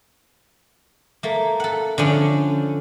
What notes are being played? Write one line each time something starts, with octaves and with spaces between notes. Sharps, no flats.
A3 A#3
A4 F#5
D3 F3 C#4 D4